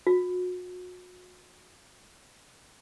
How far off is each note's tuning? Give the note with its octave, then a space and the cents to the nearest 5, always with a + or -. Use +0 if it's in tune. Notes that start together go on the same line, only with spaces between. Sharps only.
F#4 -35